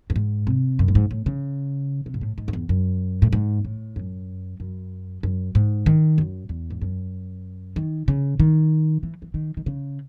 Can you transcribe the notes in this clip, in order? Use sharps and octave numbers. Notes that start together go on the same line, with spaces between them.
F#2
G#2
C3
F#2
A2
G#2
A2
C#3
C3
G#2
A2
G#2
F#2
E2
F#2
A2
G#2
A2
F#2
F#2
F#2
G#2
D#3
F#2
E2
G#2
F#2
D#3
C#3
D#3
E3
E3
D#3
D#3
C#3